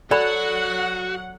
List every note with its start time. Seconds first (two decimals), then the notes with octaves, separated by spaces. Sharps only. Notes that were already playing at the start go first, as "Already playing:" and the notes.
0.11 F#3 F#4 A4 D5 F#5 B5